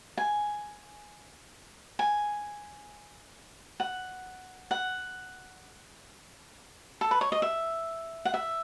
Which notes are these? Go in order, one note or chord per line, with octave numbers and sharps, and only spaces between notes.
G#5
G#5
F#5
F#5
A4
B4
C#5
D#5
E5
F#5
E5